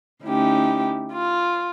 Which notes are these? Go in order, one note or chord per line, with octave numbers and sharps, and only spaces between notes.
D2 C#4 D#4 E4 G4
F4